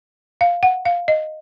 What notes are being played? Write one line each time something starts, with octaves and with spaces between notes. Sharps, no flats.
F5
F#5
F5
D#5